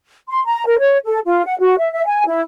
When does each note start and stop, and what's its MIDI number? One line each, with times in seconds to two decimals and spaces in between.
0.29 0.42 84
0.45 0.65 82
0.66 0.76 70
0.79 0.98 73
1.05 1.19 69
1.26 1.44 65
1.45 1.55 78
1.60 1.75 66
1.79 1.91 76
1.93 2.02 76
2.07 2.26 80
2.26 2.41 64